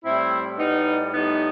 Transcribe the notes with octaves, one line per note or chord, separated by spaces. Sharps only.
A2 G3 C4 E4
A2 G3 B3 D#4
A2 G3 B3 D#4